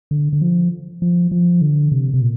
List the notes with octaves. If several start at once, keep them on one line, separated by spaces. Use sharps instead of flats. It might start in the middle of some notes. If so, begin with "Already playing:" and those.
D3
D3
F3
F3
F3
D3
C3
C3
A#2